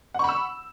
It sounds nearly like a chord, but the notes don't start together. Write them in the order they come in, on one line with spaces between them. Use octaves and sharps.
F#5 C#6 B5 E6